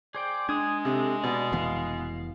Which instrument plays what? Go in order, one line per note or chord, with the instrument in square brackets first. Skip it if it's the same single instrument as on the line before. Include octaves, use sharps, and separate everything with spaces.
[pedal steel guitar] G#4 C5 G5 [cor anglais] D5
[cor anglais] G#3 [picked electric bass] D4 [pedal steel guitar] G#5 D#6
[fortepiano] C3 [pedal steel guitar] A4
[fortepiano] B2 [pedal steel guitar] D5
[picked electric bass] F1 E3 B3 [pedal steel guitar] F5